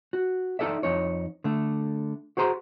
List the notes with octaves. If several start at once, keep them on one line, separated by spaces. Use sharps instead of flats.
F#4
D#4 E4 A4 D5 E5
F2 D#4 C#5
D3 A3
F#4 G#4 C5 A#5 C6